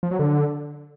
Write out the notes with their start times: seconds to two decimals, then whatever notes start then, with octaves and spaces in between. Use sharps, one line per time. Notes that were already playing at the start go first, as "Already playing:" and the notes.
0.03 F3
0.11 F#3
0.19 D3